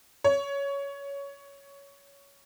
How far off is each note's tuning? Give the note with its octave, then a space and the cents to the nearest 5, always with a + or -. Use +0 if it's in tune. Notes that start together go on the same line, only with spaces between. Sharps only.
C#5 +15